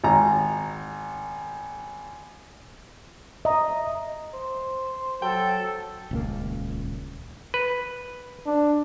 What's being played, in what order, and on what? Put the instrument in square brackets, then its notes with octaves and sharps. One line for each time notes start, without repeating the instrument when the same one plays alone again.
[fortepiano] G#1 A#5
[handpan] D#5 [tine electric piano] E5 A#5
[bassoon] C5
[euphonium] F#3 [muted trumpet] A4 [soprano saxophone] G5
[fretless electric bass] D#1 C#2 A#3
[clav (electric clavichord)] B4
[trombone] D4